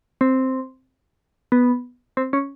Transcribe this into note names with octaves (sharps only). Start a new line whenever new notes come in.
C4
B3
C4
C#4